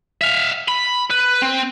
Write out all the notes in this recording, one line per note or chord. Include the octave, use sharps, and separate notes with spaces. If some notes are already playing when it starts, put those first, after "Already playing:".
E5 F5
B5
B4
C4